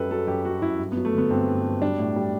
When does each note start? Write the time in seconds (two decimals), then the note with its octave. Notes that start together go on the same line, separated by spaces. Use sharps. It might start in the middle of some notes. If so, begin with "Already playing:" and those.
Already playing: F#2 F#3 G3 A4 B4
0.11 F#3 A4
0.27 F#2 G4
0.45 F#3 F#4
0.62 F#2 E4
0.79 G2
0.92 F#3 B3
1.05 A3
1.13 D3 B3
1.30 G2 C4
1.48 G2
1.64 F#3
1.82 G3 D4
1.99 A2
2.16 G3